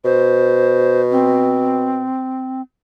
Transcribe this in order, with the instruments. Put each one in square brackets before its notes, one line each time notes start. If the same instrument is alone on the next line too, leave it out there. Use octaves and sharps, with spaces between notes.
[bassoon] B2 [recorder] C5
[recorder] C4